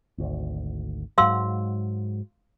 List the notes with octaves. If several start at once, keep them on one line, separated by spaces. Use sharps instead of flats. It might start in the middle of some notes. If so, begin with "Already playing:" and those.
G#1 D2
G#2 F#3 F5 C6 E6